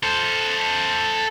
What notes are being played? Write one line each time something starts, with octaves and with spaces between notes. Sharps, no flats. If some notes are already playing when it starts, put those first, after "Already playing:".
A4 C5